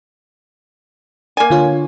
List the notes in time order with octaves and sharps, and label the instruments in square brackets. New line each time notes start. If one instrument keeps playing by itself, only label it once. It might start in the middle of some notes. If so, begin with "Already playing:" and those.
[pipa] A#3 G#5
[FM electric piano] D3 F4 C#5